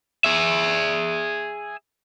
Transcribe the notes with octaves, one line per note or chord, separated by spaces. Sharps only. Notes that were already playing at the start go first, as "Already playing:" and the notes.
G#4 E5